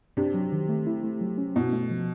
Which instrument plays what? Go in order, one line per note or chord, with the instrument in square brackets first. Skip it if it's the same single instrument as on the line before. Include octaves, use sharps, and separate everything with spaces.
[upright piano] C3 [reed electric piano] D4
[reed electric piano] F#3
D#3
A3
E4
A3
F#3
C#4
[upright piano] B2 [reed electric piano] E4
[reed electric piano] A3
F3